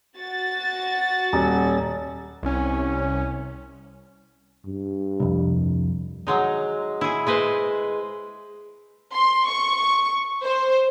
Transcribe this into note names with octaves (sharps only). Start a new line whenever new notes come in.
F#4 A6
D#1
C2 C#4
G2
C2 F2
F#3 G#3 D#4
E4 G#4
G#3 G#4 B4 C5
C6
C#6
C5